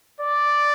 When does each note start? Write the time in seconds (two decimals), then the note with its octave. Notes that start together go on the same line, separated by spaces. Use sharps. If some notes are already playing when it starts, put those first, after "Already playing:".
0.20 D5